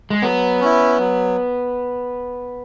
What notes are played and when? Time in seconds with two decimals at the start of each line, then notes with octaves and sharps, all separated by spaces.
0.10 G#3
0.22 F#3 B3
0.60 C#4 E4
0.99 F#3